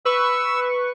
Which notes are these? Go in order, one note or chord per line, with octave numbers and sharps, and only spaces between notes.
B4 C#6 E6